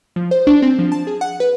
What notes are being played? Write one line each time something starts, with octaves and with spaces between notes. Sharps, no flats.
F3
C5
D4
C4
F3
A5
G#4
F#5
B4